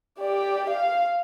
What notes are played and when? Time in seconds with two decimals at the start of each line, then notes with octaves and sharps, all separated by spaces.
0.19 G4 D5
0.69 F5